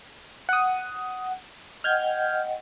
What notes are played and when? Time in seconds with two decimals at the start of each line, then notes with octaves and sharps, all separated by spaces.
0.49 F#5 D#6
1.84 D#5 F#5 G5 F6 G6 G#6